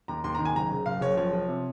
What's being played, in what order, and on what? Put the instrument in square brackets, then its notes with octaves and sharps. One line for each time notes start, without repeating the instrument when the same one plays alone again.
[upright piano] D#2 A#5
D#2 C6
D#3 A#5
G#5
F#1 A#5
C#3
F#1 F5
F#1 C#5
F3 C#5
F3
C3